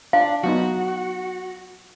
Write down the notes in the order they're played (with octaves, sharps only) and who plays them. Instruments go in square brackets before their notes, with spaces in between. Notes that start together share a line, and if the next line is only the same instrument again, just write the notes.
[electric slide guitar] D4 [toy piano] F5
[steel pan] F#3 B3 D#4 [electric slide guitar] F#4